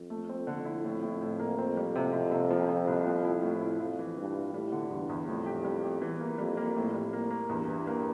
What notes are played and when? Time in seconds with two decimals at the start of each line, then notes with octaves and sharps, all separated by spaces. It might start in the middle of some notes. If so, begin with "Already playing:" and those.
Already playing: F2
0.10 A3
0.29 C4
0.47 D3
0.65 E4
0.84 A2
1.03 A2
1.21 A2
1.39 A#3
1.57 F2 C4
1.77 G3
1.96 C3
2.13 C3
2.31 C3
2.51 F3
2.68 F3
2.87 C2
3.06 F3
3.24 E4
3.43 A2
3.61 E4
3.80 F2 F4
3.99 E3
4.17 G2 E3
4.35 F4
4.54 A2 G3
4.72 D3
4.90 E2 G2
5.09 E2
5.27 F2 A2
5.46 G4
5.65 G3
5.84 G4
6.02 E2 E3
6.20 A#3
6.38 F2 G3
6.57 A#3
6.76 F2 A2
6.94 G3
7.13 A#3
7.30 A#3
7.49 E2 G2
7.68 E3
7.87 A#3